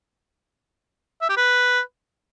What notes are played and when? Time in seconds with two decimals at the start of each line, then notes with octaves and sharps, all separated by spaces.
1.22 E5
1.29 G4
1.37 B4